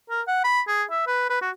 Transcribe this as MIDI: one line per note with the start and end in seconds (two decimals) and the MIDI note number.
0.10 0.22 70
0.28 0.41 78
0.44 0.61 83
0.68 0.83 68
0.91 1.04 76
1.07 1.29 71
1.30 1.39 71
1.41 1.50 66